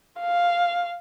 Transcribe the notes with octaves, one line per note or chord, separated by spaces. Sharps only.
F5